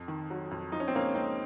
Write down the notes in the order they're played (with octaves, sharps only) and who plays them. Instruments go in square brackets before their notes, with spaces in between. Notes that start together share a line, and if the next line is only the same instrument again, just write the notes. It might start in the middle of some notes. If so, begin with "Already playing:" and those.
Already playing: [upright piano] F2
D#3
F#3
F2
F3 D#4
C#4
C4
C#2 A#3 C#4
C#2 C4 D#4